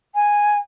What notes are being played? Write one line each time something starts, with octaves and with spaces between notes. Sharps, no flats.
G#5